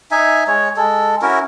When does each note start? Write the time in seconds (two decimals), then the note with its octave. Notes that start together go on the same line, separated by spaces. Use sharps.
0.11 D#4 E5 G#5
0.47 G#3 C#5
0.77 G#3 A4
1.22 C#4 E4 F#4 A#4